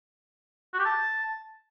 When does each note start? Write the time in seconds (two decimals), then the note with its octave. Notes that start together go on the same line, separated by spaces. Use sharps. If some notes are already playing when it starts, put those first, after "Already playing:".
0.73 F#4
0.79 G4
0.85 A5